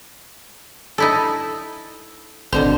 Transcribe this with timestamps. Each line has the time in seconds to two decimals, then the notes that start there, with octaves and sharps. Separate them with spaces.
0.98 D#4 E4 A4
2.53 G#1 B2 D3 C5